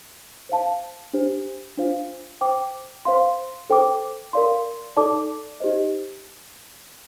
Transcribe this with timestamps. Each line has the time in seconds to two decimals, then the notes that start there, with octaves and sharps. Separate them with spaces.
0.49 C5 F5 A5
1.13 D4 G4 C5
1.78 D4 F4 C5 F5
2.41 C5 G5 D6
3.05 C5 F5 C6
3.70 A4 C5 G5 D6
4.33 A#4 D5 F5 C6
4.97 D#4 A4 D5 A5 D6
5.60 D#4 G4 C5 D#5